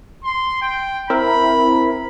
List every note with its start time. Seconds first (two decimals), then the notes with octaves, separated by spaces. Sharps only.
0.24 C6
0.62 G5
1.10 C4 E4 A#4 B5